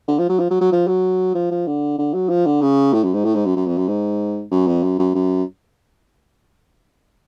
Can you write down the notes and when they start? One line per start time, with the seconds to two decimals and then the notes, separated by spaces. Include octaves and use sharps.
0.08 D3
0.19 F3
0.29 F#3
0.40 F3
0.50 F#3
0.61 F#3
0.72 F3
0.87 F#3
1.35 F3
1.51 F3
1.67 D3
1.99 D3
2.14 F#3
2.30 F3
2.46 D3
2.62 C#3
2.93 A2
3.04 F#2
3.14 G#2
3.25 A2
3.35 G#2
3.46 F#2
3.56 F#2
3.67 F2
3.77 F#2
3.88 G#2
4.51 F#2
4.67 F2
4.84 F#2
4.99 F#2
5.15 F#2